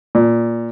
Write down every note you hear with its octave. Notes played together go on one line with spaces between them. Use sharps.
A#2